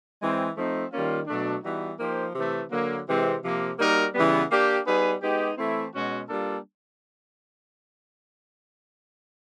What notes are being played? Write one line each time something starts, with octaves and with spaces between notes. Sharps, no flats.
E3 G#3 C4
F3 A3 C4 D#4
D#3 G3 A#3 C#4 F4
B2 F#3 A3 D4
E3 G3 B3 D#4 F#4
F3 A#3 D#4 G4 C5
C3 E3 A3
D3 F#3 A#3
C3 E3 G#3 C4
C3 F3 A#3
G3 A#3 D#4 F#4 A#4
C#3 E3 G3 B3
A#3 D4 G4
G3 B3 D#4 G#4 B4
G#3 B3 D#4 G4
E3 A3 C4 E4
B2 G#3 C#4 F#4
G3 A#3 D4 F4 A4